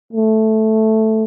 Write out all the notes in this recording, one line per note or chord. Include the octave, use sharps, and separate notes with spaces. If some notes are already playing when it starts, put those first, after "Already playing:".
A3